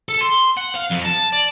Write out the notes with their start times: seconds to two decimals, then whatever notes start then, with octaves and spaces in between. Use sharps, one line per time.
0.09 A4
0.21 C6
0.57 F#5
0.75 F5
0.90 F2
1.05 A5
1.32 D5